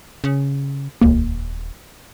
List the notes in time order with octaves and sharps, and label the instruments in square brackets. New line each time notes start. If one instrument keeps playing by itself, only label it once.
[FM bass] C#3
[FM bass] D#1 [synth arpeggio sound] C#2 A#3